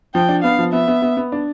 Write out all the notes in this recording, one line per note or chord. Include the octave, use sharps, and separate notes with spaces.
F3 G5
D4
B3 F5
F3
B3 E5
B3
B3
B3
D4